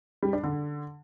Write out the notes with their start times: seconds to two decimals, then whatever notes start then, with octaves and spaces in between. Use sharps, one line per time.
0.23 G3
0.33 D4
0.44 D3